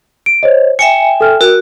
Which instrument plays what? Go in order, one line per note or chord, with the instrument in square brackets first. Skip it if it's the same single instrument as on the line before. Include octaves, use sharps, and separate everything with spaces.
[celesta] D7
C5 C#5 D#5
[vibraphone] E5 G5 G#5 [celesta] C#7
[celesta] A4 F6
[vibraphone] F#4 [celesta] A#4